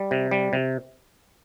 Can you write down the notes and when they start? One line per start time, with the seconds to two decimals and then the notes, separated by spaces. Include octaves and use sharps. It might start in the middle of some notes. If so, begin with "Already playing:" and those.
Already playing: G3
0.11 C3
0.31 G3
0.53 C3